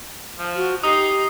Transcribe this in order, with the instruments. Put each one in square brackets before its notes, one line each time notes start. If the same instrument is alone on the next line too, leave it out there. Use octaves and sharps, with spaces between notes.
[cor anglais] F3
[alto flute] F#4
[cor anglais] D#4 [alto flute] G4 [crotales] D#6 C7